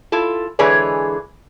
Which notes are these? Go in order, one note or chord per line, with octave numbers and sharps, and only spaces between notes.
E4 F4 A4
D3 E3 G#3 G#4 B4 C#5